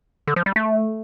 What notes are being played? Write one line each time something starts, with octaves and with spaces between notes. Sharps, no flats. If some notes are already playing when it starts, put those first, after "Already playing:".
D3
F3
G3
A3